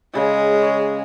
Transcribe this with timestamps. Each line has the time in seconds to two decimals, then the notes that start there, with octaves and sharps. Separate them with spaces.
0.15 C#3 G#3
0.63 C#5